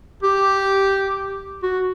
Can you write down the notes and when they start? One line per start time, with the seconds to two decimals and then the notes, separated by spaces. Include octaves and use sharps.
0.23 G4
1.63 F#4